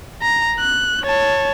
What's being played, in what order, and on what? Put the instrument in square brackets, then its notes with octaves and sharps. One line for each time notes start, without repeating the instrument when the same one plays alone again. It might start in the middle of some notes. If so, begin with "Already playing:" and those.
[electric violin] A#5
F#6
C#5 A5